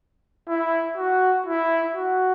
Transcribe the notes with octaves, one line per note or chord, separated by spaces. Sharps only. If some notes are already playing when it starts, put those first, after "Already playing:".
E4
F#4
E4
F#4